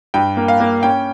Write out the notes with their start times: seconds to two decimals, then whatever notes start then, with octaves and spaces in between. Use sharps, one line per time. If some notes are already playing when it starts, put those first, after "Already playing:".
0.14 G2 G5
0.37 A#3
0.48 F5
0.60 A#3
0.83 C#4 G5